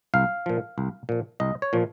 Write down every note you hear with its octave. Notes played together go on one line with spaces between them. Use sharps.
C2 F5
A#2 F3
C2
A#2 F3
C2 D#5
C#5
A#2 F3